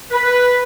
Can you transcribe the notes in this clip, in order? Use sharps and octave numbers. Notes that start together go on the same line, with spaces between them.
B4